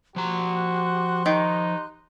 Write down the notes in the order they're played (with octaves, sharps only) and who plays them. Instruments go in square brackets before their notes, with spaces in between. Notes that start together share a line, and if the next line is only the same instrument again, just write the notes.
[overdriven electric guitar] F3 A#5 [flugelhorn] F#4 [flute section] G4 C6 F#6
[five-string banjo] D#3 [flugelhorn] D#4